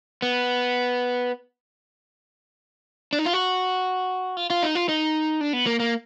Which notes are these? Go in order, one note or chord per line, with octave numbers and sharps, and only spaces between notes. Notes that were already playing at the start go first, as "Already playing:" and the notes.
B3
D4
D#4
F4
F#4
F4
F4
D#4
F4
D#4
D4
B3
A#3
A#3